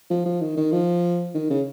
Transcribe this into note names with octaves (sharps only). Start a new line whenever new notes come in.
F3
F3
D#3
D#3
F3
D#3
C#3